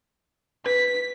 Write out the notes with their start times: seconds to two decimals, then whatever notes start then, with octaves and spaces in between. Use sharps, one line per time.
0.66 B4 B6